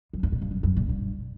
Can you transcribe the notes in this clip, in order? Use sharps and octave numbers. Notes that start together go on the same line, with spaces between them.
F#2
G2
A#2
G2
F#2
F#2
A#2
G2